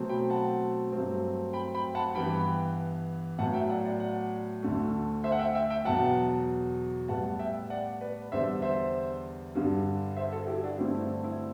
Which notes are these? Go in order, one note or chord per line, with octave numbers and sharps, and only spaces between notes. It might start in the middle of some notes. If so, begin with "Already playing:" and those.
Already playing: B2 F#3 A3 C4
G5 B5
F#5 A5
G2 F#3 A3 C4
G5 B5
G5 B5
F#5 A5
G2 E3 B3 G5 B5
A2 F#3 B3 F#5 A5
E5 G5
D5 F#5
D5 F#5
D5 F#5
D2 D3 A3
C5 E5
F#5
E5 G5
E5 G5
E5 G5
E2 B2 F#3 F#5 A5
A2 G3 B3 F#5 A5
E5 G5
D5 F#5
B4 D5
E2 D3 G3 C5 E5
C5 E5
G2 D3 G3
C5 E5
F#4 A4
E4 G4
D4 F#4
G2 D3 A3 C4 E4
E4
D4
E4